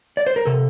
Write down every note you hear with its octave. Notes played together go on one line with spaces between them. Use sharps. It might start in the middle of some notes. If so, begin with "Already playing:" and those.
D5
C5
A#4
C3 A4